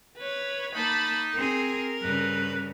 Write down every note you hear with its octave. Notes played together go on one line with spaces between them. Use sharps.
B4 C#5
A#3 D#4 A5 B5
C4 G#4 A#4
G2 C#3 B4